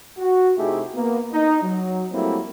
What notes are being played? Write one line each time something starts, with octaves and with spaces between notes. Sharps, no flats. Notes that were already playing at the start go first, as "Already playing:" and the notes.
F#4
C3 A3 D#4 E4 G4 G#4
A#3 B3
D#4
F#3
F#3 G3 A3 A#3 C4 E4